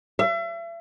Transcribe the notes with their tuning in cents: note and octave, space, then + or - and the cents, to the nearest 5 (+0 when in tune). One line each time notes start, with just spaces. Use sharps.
E5 +40